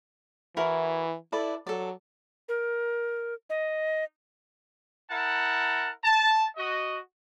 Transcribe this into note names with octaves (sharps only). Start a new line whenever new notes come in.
E3 E4 F#4 A#4
E4 A4 B4 D5
F#3 A4 D5
A#4
D#5
E4 A#4 F#5 A5
A5
F#4 D#5